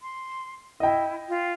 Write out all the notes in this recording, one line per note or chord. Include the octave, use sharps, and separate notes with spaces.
C6
E4 D#5 G5
F4